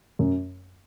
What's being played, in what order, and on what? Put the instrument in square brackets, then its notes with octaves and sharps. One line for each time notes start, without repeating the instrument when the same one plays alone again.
[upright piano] F#2